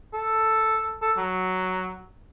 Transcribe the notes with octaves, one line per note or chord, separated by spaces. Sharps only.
A4
A4
F#3